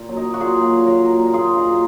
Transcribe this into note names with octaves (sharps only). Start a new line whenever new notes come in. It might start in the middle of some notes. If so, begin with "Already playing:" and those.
Already playing: A#2
F#3
D#4
F#3
F#4
A#2 F4 G#4
A#2
F#3
F#3 F#4 A#4
A#2
A#2
F#3 F4 G#4
F#3
D#4
A#2